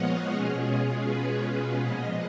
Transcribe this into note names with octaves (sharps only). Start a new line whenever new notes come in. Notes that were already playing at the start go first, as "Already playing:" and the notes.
Already playing: A#2 F3 G#3 B3 C#5 D#5 F5 F#5
B2 G#3 C#4 F4 G#4
B4
A#2 F3 G#3 B3 D#5